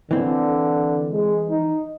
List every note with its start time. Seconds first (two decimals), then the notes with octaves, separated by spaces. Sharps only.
0.11 D3 E3 C4
1.11 G#3
1.50 D#4